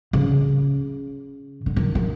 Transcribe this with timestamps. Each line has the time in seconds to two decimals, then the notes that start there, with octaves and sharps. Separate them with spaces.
0.13 C#3
1.66 D3
1.76 D#3
1.95 D#3